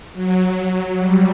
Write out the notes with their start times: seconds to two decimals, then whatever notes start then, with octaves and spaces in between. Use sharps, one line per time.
0.13 F#3
0.98 G3